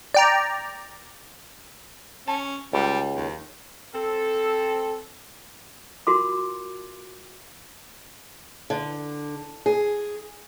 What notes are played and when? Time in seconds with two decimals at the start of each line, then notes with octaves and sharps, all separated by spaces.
0.14 D5 G5 A#5
2.28 C#4 A5
2.73 C#2 G3
3.16 D#2
3.94 C4 A4
6.07 F4 F#4 A#4 C6 D6
8.70 D3
9.66 G#4